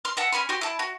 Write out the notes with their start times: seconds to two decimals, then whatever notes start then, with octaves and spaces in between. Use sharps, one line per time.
0.05 C6 F6
0.17 E5 F#5 A5
0.32 C#4 G#5 B5 C6
0.49 F#4 G4 C6
0.61 E4 A5
0.79 F#4